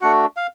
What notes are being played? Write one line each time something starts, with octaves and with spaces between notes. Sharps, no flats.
A3 D4 F#4 F#5
F5